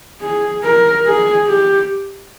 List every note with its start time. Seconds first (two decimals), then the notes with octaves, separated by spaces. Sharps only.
0.22 G#4
0.64 A#4
1.06 G#4
1.48 G4